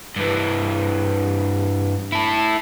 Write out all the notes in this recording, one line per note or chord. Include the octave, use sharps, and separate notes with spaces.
G2 E3
E4 A4